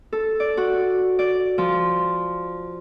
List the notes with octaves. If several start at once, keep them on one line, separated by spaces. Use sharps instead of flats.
A4
D5
F#4
D5
F3